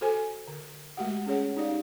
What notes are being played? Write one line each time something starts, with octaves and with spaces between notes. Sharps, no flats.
F#4 A4 C5 G#5
D3
G#3 A3 F#4 G4 F#5
C#4 G#4 C#5 F#5
D#4 G4 D5 F5